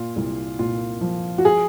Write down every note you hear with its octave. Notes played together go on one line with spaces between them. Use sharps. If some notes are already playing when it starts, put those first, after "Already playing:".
Already playing: A#2 F4
C2
A#2 F4
F3
F#4
G#4